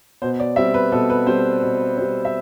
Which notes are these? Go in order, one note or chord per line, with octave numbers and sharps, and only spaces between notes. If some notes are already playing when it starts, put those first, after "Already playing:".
B2 C5
D5
G3 C4 E5
B4
B2 A4
B4
G3 C4 C5
B2
G3 C4
E5